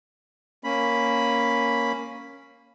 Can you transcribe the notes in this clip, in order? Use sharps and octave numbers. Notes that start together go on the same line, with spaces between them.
A#3 C#4 B5